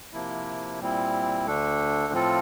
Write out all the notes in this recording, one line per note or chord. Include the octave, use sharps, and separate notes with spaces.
C3 F3 A#3 E4
A#2 G3 C4 E4
D2 D3 A3 D4 A4
A2 F3 C4 F4 A4